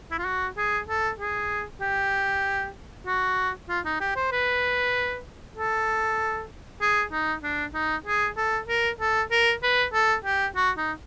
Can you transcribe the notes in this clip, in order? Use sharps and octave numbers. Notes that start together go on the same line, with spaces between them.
E4
F4
F#4
G#4
A4
G#4
G4
F#4
F4
D#4
G4
C5
B4
A4
G#4
D#4
D4
D#4
G#4
A4
A#4
A4
A#4
B4
A4
G4
F#4
D#4